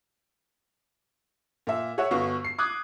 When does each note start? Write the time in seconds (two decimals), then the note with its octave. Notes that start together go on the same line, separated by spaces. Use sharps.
1.67 A#2 E5
1.98 G#4 C#5 E5 F#5
2.11 G1 B3 F#4 F5 C#6
2.44 C7
2.58 D6 D#6 F#6 G#6